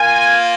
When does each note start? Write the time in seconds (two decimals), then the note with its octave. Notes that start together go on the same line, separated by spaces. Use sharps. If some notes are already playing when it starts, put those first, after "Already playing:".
Already playing: A#3 F4 G#5